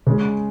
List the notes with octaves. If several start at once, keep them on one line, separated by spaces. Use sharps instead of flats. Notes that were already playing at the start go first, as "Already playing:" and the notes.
C#3 G#3 C#4